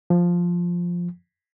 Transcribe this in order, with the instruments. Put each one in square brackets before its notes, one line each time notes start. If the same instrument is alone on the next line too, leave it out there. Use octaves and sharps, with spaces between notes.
[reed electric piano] F3